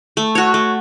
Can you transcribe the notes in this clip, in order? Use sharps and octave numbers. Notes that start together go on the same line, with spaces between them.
A3
F#4 C#5
A3